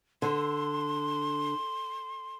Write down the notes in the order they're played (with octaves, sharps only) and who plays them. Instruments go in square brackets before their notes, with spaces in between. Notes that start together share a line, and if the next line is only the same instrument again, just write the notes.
[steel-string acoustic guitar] D3 [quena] C6